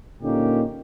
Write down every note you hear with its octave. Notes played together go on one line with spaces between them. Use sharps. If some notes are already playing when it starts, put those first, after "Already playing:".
A#2 D3 A#3 C#4 D#4 G4